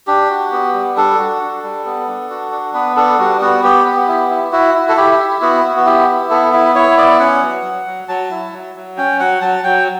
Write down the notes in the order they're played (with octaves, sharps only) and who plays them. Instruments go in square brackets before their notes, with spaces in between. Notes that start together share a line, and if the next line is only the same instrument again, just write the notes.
[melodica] D4 G4
F#4
B3
G3
D4 A4
F#4
D4
G3
B3
D4
F#4
D4
B3 B4
D4 A4
G3 F#4
B3 F#4
B3 G4
B3
E4
E4
E4 F#4
E4
A4
E4 G4
E4
B3 F#4
B3
F#4
E4 G4
E4
B3 A4
E4 B4
E4 C#5
B3 D5
C#4 F#5
F#3
F#3
F#3
F#3 A5
E4
F#3
F#3
C#4 G5
F#3 F#5
F#3 A5
F#3 G5